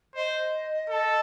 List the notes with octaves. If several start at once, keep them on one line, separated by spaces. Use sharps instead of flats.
C5 D#5
A4